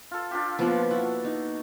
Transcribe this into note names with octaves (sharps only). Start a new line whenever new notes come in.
F4 A4
D4 F4 G4
B2 F3 A#3 B3
E4 F#4
D#4